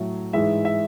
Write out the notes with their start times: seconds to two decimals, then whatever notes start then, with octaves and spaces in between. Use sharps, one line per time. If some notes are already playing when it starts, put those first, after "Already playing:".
Already playing: A2 F#3 A3
0.33 G#2 E3 G#3 E5
0.65 E5